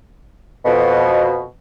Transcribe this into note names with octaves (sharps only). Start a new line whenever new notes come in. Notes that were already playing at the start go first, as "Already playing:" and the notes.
F2 B2